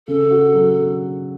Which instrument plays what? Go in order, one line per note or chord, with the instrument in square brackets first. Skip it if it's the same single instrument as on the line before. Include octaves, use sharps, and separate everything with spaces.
[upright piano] C#3 [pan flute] A4
[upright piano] F#4
F#3